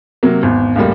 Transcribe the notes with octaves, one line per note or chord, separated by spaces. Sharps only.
C3 F#3 A#3
G#1 E2
C#2 F#2 A2 G3 A#3